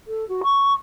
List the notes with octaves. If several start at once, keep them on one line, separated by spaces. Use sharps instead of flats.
A4
F#4
C#6